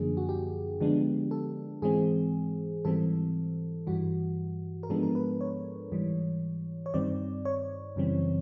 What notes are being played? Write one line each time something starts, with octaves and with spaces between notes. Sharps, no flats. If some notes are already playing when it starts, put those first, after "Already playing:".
Already playing: F#2 D3 F3 A#3 D4 G#4
F#4
G4
D3 F3 G#3 B3 D4
A4
G#2 E3 G#3 C4 G#4
G#2 E3 G3 C4 A4
G2 E3 G3 F#4
A#4
G#2 F3 G#3 B3 D4 A4
A#4
B4
C#5
G#2 E3 G3
C#5
G2 D#3 G3 C4 D5
C#5
F#2 C#3 E3 G3 C4